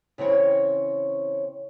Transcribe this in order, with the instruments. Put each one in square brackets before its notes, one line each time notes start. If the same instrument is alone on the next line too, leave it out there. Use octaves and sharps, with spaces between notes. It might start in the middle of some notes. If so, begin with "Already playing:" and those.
[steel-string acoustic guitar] C#3 E3 C4 C#5